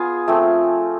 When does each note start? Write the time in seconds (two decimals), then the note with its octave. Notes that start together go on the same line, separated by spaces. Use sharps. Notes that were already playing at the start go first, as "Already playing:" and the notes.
Already playing: B3 F4 G#4
0.28 F3 A3 C4